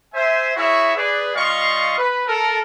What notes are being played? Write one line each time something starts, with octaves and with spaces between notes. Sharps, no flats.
C5 E5 G#5
E4 F#4 G#4 C#5 E5
G#4 B4 D5
G3 F4 D#5 F5 C6 C#6
B4
A4 A#4